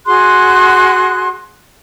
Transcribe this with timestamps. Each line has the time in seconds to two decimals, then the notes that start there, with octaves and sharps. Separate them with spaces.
0.06 F#4 G#4 C6 F#6